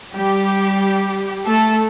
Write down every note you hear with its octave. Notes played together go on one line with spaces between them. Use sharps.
G3 G4
A3 A4